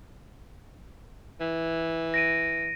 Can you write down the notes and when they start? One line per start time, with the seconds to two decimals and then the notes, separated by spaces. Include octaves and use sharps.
1.40 E3
2.14 A#6 D7 D#7